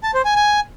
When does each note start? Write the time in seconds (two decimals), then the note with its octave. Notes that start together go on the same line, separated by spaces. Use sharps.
0.03 A5
0.14 C5
0.25 G#5
0.36 G#5